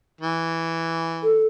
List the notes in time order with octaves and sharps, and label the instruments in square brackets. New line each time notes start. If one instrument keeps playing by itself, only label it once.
[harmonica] E3
[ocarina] A4